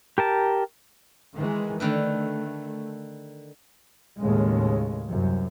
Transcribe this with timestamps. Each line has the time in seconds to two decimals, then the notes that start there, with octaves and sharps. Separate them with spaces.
0.18 G4 A#4 A5
1.37 D#3 E3 G#3
1.80 D3 D#3 A3 B4
4.19 D#2 A2 C#3 G#3
5.09 C2 F#2